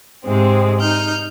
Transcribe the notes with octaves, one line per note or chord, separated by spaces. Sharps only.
G#2 C3 G#3 C4
D#4 F6 G6